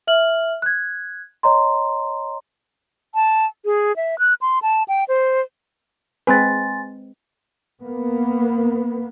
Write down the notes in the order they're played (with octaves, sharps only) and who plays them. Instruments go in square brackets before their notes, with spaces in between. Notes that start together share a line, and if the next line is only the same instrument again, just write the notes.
[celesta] E5 F6 F#7
F#6 G#6
C#5 D#5 A#5 C6
[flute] A5
G#4
E5
F#6
C6
A5
G5
C5
[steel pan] G#3 C4 B4 [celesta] G#5 C6 A6
[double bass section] A#3 B3